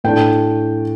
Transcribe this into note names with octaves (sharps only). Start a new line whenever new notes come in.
A2 A3 D4 G5